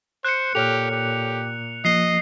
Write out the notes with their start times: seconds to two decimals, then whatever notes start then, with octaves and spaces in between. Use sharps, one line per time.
0.25 C5 F#6 C#7
0.55 A#2 G4 A4 C#5 F6 F7
0.91 G4
1.85 F3 A#3 D#5 C7